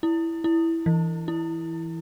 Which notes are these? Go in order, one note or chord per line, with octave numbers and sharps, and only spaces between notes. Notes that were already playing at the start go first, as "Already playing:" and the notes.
E4
E4
E3
E4